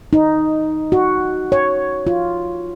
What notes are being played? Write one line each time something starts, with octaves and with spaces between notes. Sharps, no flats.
D#4
F#4
C#5
F4